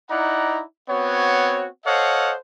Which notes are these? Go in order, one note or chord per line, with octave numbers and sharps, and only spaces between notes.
D#4 E4 D5 F#5 A#5
B3 C4 F#4 C#5
A4 C5 C#5 D#5 F5 F#5